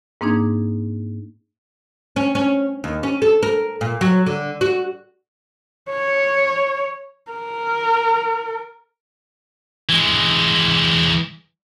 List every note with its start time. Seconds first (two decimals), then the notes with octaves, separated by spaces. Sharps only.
0.21 G#2 A#3 C4 D4 D#4 G#6
2.16 C#4
2.35 C#4
2.84 D#2
3.03 C#4
3.22 A4
3.43 A#4
3.81 A#2
4.01 F#3
4.26 D3
4.61 F#4
5.91 C#5
7.32 A#4
9.89 E3 G#3